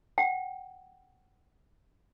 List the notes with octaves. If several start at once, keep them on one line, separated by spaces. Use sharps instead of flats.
F#5 G5